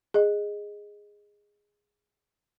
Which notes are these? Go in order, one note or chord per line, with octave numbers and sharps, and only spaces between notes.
G#4 D#5